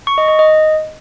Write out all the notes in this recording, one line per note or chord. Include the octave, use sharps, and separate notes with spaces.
C#6
D#5
D#5
D#5